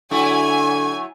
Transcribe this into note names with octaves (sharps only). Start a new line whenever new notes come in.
D3 F#3 A3 E4 G#5 C#6